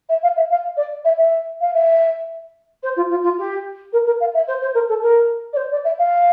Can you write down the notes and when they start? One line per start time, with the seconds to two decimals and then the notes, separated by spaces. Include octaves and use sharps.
0.09 E5
0.22 F5
0.36 E5
0.50 F5
0.76 D5
1.04 E5
1.17 E5
1.60 F5
1.73 E5
2.83 C5
2.96 F4
3.09 F4
3.23 F4
3.38 G4
3.92 A#4
4.06 A#4
4.20 F5
4.34 E5
4.47 C5
4.61 C5
4.74 A#4
4.88 A4
5.02 A#4
5.53 D5
5.56 C5
5.71 D5
5.84 E5
5.98 F5